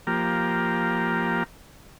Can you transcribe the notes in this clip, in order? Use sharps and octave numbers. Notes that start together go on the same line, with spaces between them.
F3 A#3 G4 A#5